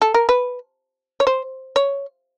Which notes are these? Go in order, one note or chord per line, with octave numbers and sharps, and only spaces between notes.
A4
A#4
B4
C#5
C5
C#5